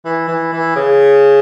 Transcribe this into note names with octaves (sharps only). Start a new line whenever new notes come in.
E3
E3
E3
C#3